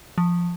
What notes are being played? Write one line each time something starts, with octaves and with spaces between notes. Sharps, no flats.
F3